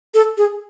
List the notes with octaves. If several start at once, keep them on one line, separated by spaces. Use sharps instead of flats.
A4
G#4